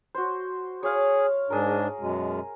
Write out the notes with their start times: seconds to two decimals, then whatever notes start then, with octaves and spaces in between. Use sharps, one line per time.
0.15 F#4 C5
0.83 G#4 C#5 F5
1.50 G#2 D4 G#4 A#4
2.00 F#2 B2 G#3